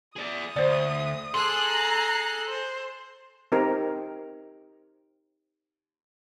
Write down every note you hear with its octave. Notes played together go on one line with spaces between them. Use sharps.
G#4 D5 D#6
D2 C5 D5
G#4 A4 C6 F#6 C7
A#5
C5
C4 D#4 G4 A#4